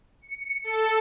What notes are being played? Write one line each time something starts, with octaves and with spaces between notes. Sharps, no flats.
C#7
A4